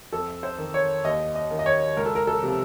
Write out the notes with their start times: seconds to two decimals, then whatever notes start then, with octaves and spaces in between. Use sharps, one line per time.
0.13 F2 A4
0.43 C5
0.58 D#3
0.74 C#5
1.04 D#2 D#5
1.35 D#5
1.51 D#3
1.59 D#5
1.66 C#5
1.97 C#2 A#4
2.06 A4
2.15 A#4
2.27 A4
2.43 C3 F3